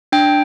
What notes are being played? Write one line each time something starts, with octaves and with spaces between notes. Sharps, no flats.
D4 G5